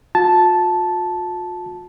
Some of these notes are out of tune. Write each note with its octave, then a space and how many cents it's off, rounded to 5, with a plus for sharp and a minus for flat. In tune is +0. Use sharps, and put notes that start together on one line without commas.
F4 +45 A5 -10